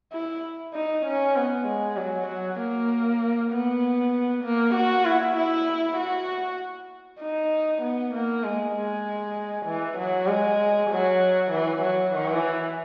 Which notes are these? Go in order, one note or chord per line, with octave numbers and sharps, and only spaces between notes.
E4
D#4
C#4
B3
G#3
F#3
F#3
A#3
B3
A#3
F#4
E4
E4
F#4
D#4
B3
A#3
G#3
G#3
E3
F#3
G#3
F#3
E3
F#3
E3